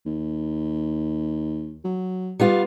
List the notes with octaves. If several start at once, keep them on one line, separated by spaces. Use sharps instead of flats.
D#2
F#3
G3 B3 F4